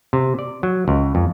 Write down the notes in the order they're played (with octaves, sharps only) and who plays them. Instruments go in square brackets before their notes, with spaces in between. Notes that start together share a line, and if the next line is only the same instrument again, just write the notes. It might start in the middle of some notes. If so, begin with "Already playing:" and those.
[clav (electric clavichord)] C3
D5
F#3
C#2
F2